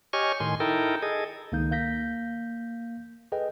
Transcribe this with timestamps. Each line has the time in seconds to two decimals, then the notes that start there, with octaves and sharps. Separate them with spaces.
0.13 G4 C#5 D#5 G#5 C#6 F6
0.40 A2 D#3 G#5 C6
0.60 D#4 E4 A4 A#4 G5
1.02 G#4 A4 D#5
1.52 C#2 D#3 A#3 D#4 G6
1.71 A#3 F5 G6 A#6 B6
3.32 G#4 A4 B4 D#5 G5